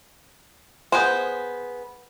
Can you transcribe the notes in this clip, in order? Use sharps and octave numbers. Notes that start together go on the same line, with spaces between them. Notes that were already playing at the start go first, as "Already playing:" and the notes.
B3 G#4 C5